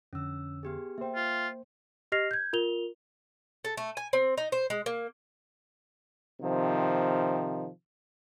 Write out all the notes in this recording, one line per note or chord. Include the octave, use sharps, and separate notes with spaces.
F2 D3 C#4 E6
B3 G4 G#4
A#3 C5 E5 G5
F4
G4 D#5 F6 A#6 C7 F7
G6 G#6
F4 A#4 F7 G7
A4
A3
G#5
C4
D#4
C5
G#3
A#3
C3 D#3 F3